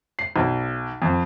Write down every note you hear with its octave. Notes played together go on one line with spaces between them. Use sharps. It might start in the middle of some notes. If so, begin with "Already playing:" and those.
C7
B1
F2